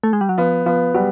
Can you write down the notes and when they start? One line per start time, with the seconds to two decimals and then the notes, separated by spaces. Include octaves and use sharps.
0.04 A3
0.13 G#3
0.21 G3
0.29 F#3
0.38 F3 B3
0.66 F3 B3
0.94 F#3 G3